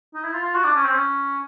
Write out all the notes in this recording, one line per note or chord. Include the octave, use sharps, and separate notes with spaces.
D#4
E4
F4
F4
F#4
D4
C#4
C4
C#4